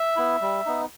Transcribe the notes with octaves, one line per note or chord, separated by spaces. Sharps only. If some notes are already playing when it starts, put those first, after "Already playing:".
Already playing: E5
B3 E4
G3
B3 D#4